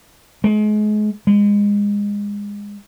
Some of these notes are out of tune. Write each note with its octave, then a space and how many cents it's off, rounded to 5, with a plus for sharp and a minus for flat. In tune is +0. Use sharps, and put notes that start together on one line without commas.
G#3 +35
G#3 -25